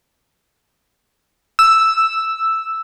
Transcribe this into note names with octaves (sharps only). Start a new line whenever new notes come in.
E6